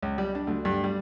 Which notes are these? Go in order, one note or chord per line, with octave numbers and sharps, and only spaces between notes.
C#2
G3
D4
D2
G2
G3